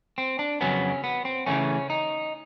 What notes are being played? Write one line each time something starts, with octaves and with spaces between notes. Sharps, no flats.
C4
D4
F2 C#3 F#3 B3 C#4
B3
C4
C#3 E3 A3 C#4
D#4